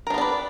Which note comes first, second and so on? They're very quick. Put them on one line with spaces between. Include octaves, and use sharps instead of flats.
A#4 D4 B3 D5 B4